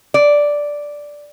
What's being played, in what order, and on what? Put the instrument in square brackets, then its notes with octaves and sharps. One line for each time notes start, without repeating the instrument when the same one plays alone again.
[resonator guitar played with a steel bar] D5